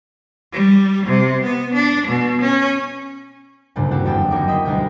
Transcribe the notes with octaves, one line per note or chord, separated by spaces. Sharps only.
G3
C3
B3
D4
B2
C#4
D2 G2 A#2 C#3
C4 D4 E4 F#4 G4 C5
F#1 E2 E3 C4 G5 A5
D#2 F#3 C4 A#4 D6
D#5 E5 G5 B5 C6
D2 B2 G3 G#3 A#4 G5